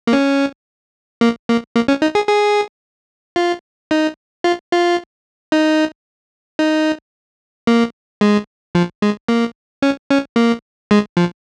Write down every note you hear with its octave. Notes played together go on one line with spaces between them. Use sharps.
A#3
C#4
A#3
A#3
A#3
C#4
D#4
G#4
G#4
F4
D#4
F4
F4
D#4
D#4
A#3
G#3
F3
G#3
A#3
C#4
C#4
A#3
G#3
F3